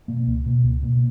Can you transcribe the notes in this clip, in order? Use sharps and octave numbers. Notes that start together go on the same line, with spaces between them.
B2 A#3
C#2
B2 A#3
C#2
B2 A#3